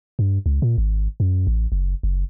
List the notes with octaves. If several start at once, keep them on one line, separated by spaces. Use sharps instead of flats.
G2
C#2
A#2
G#1
F#2
A1
F#1
F#1